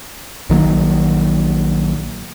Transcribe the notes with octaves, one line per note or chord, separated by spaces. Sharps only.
A#1 D#3 F#3 A#3